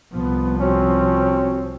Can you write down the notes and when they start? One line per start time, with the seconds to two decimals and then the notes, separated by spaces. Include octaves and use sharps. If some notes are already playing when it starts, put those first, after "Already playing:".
0.13 C2 F3 B3
0.61 C4 C#4 F#4